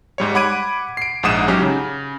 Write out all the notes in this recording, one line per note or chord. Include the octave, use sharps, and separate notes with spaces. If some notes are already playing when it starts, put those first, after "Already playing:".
G#2 G3 C#5
F#5 B5 D6 G#6 D7 D#7
C7 D7
A#1 G#2 F#5 D#6 E7
F#3 C#4 D#4 G4
C#3